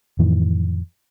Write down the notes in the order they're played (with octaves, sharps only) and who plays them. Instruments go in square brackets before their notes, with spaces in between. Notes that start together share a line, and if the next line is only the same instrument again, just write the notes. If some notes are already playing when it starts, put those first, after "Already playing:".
[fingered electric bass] F2 A2 D#3 E3